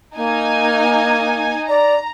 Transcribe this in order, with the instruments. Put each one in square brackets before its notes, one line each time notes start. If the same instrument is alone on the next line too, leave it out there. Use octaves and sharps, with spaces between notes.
[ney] A#3 [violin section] D#4 G#5
[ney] D5 [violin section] A#5